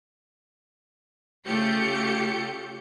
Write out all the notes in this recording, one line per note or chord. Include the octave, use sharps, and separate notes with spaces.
C#3 A3 F4 G4 G6 C#7